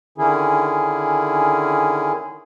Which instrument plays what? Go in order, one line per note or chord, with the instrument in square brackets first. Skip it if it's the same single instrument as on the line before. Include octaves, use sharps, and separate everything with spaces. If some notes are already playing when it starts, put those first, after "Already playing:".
[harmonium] D3 D#3 C#4 E4 G#4